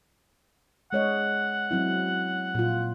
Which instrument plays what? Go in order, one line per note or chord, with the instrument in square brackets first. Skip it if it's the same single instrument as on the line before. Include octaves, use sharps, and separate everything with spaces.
[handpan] G#3 C#5 D#5 [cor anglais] F#5
[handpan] F#3 C4 E4
A#2 F4